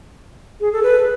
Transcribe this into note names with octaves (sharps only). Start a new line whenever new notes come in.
G#4
A4
B4